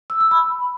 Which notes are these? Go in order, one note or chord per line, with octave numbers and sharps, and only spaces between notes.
E6
E6
B5